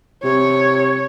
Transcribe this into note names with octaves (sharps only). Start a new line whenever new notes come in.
C3 C#5